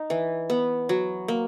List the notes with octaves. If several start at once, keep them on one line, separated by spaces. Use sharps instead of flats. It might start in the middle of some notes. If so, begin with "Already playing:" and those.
Already playing: D#4
E3
B3
F#3
A#3